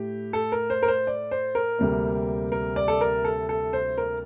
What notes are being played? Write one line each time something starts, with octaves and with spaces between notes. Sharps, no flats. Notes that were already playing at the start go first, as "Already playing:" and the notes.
Already playing: A2 A3 G4
A4
A#4
C5
A#4
C5
D5
C5
A#4
D2 C3 G3 A#3
A#4
D5
A4
A#4
A4
A4
C5
A#4